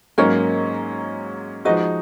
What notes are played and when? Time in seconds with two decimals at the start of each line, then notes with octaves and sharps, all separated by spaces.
0.18 G#2 F#3 A#3 C#4 A#4 C#5
1.65 F3 G#3 D#4 F#4 B4 D#5